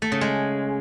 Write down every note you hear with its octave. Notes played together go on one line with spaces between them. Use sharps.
A3
C#3
G#3